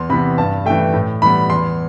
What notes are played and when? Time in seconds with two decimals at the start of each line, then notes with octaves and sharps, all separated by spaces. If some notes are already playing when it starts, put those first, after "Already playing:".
Already playing: E2 C6
0.09 C3 E3 B3 B5
0.38 G2 A5
0.66 E3 A3 G5
0.94 A2
1.22 E3 G3 B3 B5
1.50 E2 C6